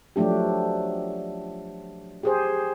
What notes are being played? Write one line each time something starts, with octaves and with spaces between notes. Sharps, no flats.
F3 F#3 A3 D4 G4
G4 G#4 C5